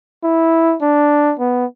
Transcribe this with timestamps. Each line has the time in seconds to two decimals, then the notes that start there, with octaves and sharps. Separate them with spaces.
0.23 E4
0.81 D4
1.39 B3